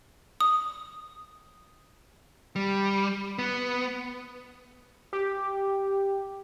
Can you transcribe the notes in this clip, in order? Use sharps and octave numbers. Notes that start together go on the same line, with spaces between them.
D#6
G3
B3
G4